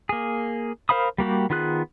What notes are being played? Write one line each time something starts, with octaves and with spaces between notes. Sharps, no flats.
A#3 G#4
A#4 C5 F5 B5 D#6
G3 A#3 F#4 G4
D#3 B3 F4 G#4 F#6